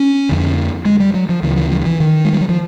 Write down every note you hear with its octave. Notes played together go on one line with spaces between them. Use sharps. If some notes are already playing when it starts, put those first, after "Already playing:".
Already playing: C#4
F2 D3
G#3
G3
F#3
F3
D2 C#3 E3
E3
F3
D#3
E3
D#3
G#3
G3
F#3
F3